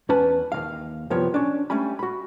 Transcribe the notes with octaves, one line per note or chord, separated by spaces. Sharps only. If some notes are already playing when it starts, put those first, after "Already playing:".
E2 C#4 B4 A5
D#2 C#3 F5
C2 F#2 F3 B3 G4 C#5
C#4 D4
G3 A3 C#4 G#5 B5
F#4 B5